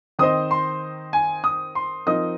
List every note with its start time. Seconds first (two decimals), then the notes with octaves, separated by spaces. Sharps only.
0.19 D#3 C4 D#4 C5 D#5 D#6
0.51 C6
1.13 G#5
1.44 D#6
1.75 C6
2.06 F3 C4 D#4 A#4 D#5 D#6